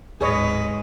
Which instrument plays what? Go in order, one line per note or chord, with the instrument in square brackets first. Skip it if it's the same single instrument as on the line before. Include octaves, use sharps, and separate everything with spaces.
[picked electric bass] D1 [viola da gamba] G#2 [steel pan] G#4 C#5 D#5 [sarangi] B4